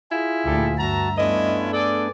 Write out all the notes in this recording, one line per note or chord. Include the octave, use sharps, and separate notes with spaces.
E4 F4 G#4
D2 A#2 G3 G4 A4
G2 F#4 E5 A5 A#5
A3 B3 C#4 D4 E4 F4 D#5
G#4 A4 D5